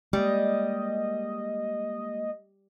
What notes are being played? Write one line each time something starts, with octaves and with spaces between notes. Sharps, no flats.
G3 G#3 A#3 D#5